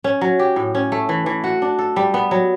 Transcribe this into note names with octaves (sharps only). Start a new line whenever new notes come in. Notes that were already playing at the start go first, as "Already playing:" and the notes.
C#4
F#3
G4
A2
C#4
A3
E3
E3
F#4
D4
A4
G3
B3
F#3